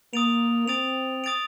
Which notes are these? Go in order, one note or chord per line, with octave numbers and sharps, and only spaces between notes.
A#3 D#6 A6 D7 F7
C4 D#6 A6 D7 F7
D#6 A6 D7 F7